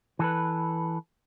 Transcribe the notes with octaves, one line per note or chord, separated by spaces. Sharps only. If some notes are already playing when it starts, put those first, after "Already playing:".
E3 A4 B4